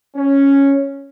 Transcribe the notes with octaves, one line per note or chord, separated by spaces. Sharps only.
C#4